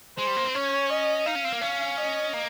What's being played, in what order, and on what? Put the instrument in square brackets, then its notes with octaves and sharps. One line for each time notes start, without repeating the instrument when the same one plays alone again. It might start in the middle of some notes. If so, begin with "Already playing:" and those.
[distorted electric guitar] G#3 [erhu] C5
[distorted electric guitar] G3
A#3
C4
[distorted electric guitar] C#4 [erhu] C#5
[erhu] D#5
[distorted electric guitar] D#4 [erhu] F5
[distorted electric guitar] C#4
C4
A#3
C#4
[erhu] D#5
[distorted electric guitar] A#3